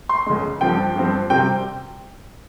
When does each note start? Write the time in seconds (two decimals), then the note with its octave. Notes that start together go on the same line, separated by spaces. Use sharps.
0.09 C6
0.27 C#2 C#3 G#3
0.61 G2 F3 C4 G5
0.96 G2 F3 C4
1.30 C3 G3 C4 G5